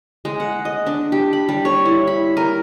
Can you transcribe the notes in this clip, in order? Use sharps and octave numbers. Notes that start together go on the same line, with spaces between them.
G#3
F#5
D#5
D4
G4
B5
G3
C#5
E4
B5
A#4